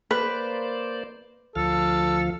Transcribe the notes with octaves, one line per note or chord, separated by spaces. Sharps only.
A#3 B4 C5 D5
D2 F3 A4 F5